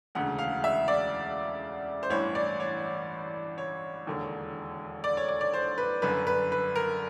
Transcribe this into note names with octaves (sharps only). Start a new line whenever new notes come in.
E1 D2 C#3 F#5
F5
E5
D5
C5
A1 G2 E3 C#5
D5
C#5
C#5
E1 D#2 D3
D5
C#5
D5
D5
C5
B4
G1 F#2 D3 B4
B4
B4
A#4